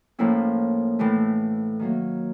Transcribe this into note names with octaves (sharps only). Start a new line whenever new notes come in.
A2 F3 A#3 C#4 E4
A2 E3 A3
D#3 F#3 A#3